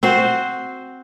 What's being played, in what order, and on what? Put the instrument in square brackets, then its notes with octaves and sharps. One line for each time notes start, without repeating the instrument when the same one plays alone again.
[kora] C4 F#4 C5